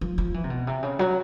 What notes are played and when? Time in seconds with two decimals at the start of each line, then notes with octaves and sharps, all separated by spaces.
0.01 F3
0.18 F3
0.34 E3
0.44 C3
0.50 B2
0.67 C3
0.83 C#3
0.99 F#3